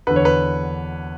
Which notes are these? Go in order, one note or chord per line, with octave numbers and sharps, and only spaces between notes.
E2 D3 B4
C#5
B4